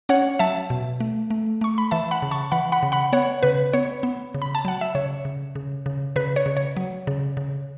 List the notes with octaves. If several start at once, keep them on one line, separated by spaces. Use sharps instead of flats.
C#4 C#5 F#5
F#3 E5 A5
B2
A3
A3
A3 C#6
B5
E3 E5 A5
F#5 B5
C#3
A5 C#6
E3 F#5 B5
F#5 B5
C#3
F#5 B5
B3 C#5 F#5
C#3 B4
B3 C#5
B3
C#3
B5
A5
F#3 F#5
E5
C#3 C#5
C#3
C#3
C#3
C#3 B4
C#5
C#3
C#5
F#3
C#3
C#3